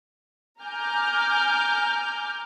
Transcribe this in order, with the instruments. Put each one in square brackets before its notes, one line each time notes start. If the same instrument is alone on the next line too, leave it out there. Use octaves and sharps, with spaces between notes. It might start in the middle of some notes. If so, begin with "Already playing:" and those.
[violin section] G#5 A#5 D6 F6 G6